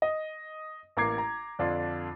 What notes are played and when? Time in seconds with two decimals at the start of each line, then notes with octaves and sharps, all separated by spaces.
0.02 D#5
0.97 A1 A#3 A#5 D6 G#6 C7
1.18 A#5
1.59 F2 D3 D4 F4